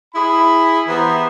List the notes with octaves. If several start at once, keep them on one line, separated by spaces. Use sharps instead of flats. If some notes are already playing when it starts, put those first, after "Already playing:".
E4 G#4 B5
E3 B3 G4 C5 A#5